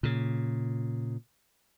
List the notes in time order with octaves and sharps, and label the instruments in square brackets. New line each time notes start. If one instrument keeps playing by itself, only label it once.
[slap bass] A#2 C#3